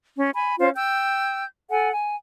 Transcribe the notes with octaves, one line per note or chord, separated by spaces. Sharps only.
C#4
G#5 B5
C#4 F4 C5 F5
G5 E6 G6
A4 F#5 G#5
G#5